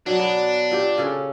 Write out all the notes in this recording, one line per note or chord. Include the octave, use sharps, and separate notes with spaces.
B2 F#3 D4
B3
A#2 G4
C#3 C#4 A4